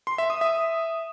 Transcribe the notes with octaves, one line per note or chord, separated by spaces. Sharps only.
C6
E5
D#6
E5